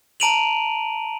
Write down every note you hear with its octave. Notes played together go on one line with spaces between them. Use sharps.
A5 A#5 D7 D#7 F7 F#7